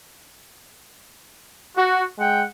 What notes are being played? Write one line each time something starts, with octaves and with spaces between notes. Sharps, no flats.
F#4
G#3 F#5 G5